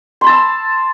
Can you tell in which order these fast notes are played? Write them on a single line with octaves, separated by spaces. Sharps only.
C6 B5 A5 E6